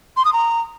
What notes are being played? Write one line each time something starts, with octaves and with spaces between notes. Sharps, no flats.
C6
D#6
A#5